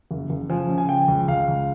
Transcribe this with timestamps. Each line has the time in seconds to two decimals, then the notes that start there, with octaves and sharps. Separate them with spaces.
0.11 F#1
0.30 F#1
0.49 F3 G#5
0.69 C#3
0.78 G#5
0.89 F3 G5
1.08 C#2
1.28 C#2 F5
1.48 C#2